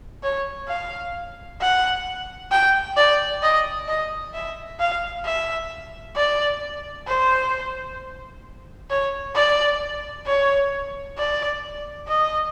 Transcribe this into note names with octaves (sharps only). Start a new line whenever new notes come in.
C#5
F5
F#5
G5
D5
D#5
D#5
E5
F5
E5
D5
C5
C#5
D5
C#5
D5
D#5